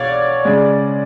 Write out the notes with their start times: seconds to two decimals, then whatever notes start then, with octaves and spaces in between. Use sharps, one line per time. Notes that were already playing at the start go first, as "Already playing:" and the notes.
Already playing: B2 C#5 D5 F5
0.45 C#3 G#3